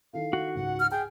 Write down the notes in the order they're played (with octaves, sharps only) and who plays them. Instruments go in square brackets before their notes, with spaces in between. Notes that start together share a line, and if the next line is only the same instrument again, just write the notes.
[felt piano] D#3 E4 A4 [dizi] F5
[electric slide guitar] F#4
[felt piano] C#2 G#2 [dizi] F#5
[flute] F6
[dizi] G#4 [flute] G5 [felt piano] G#5